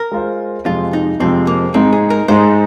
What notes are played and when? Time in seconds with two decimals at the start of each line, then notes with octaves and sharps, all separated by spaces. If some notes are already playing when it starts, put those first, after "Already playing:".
Already playing: A#4
0.12 G#3 F4 C5
0.65 F2 C3 F3 G#3 F4
0.93 D#4
1.20 F2 C3 F3 G#3 C4
1.47 A#3
1.74 G#2 G#3 C4 D#4
1.93 G#4
2.10 A#4
2.28 G#2 G#3 D#4 C5